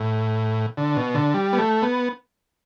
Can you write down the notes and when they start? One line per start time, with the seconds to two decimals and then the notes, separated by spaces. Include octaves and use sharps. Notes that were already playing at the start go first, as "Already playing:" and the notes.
Already playing: A2
0.77 D3
0.97 B2
1.14 D3
1.34 G3
1.53 B3
1.58 A3
1.83 B3